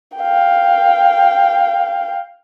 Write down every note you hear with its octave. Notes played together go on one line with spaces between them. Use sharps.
F5 G5